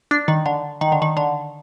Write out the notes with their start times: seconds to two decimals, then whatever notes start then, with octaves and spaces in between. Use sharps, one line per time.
0.11 D4
0.28 D#3
0.46 D3
0.81 D#3
0.92 D3
1.02 D#3
1.17 D3